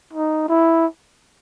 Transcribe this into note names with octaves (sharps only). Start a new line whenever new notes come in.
D#4
E4